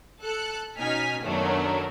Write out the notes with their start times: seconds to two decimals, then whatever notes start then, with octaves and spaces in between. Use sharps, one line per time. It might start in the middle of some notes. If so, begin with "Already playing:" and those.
0.22 A4 F#6 C#7
0.78 B2 C#4 D#4 G#5 F6 B6
1.23 F#2 D#3 F#3 A3 B3 D4